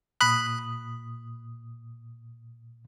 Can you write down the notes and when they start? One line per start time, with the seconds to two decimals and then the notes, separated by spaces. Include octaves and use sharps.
0.21 A#2 B5 D#6 F#6